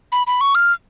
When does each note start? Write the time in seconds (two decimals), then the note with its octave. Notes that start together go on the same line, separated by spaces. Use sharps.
0.12 B5
0.27 B5
0.41 C#6
0.55 F6